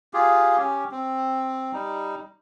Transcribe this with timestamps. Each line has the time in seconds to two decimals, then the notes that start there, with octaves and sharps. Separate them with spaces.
0.14 F4 G4 G#4
0.58 C#4 G4
0.91 C4
1.73 G3 D#4